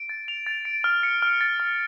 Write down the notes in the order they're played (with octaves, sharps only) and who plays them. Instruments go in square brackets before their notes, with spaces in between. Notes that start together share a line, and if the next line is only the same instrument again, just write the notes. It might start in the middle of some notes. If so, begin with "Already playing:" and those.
Already playing: [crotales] D7
A6
F7
A6
D7
F6
C#7
F6
A6
F6